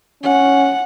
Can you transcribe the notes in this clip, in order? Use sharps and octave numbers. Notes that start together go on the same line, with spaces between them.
C#4 F#5